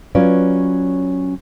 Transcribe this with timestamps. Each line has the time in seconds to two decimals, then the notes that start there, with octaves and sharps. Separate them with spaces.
0.15 F#3 C#4 F4 B4 D5